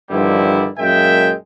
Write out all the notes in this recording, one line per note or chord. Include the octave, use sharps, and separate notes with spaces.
G2 D3 D#3 F3 G3 E4
F#2 A#2 G#3 A#4 E5 G5